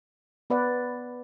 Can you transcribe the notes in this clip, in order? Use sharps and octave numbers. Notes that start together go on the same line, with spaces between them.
B3 B4 D5 F#5